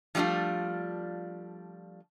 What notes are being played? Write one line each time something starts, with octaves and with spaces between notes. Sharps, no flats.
F3 G3 A3 D4 F4